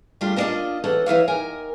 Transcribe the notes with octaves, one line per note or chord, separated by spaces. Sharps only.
G3 A3 D4 F4 G4
A#3 B3 D4 F4 D5 D#5
E3 C#4 A4 F#5
E3 E4 C#5 F5
D#2 A#4 G#5